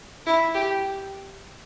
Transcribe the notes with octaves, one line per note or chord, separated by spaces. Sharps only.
E4
G4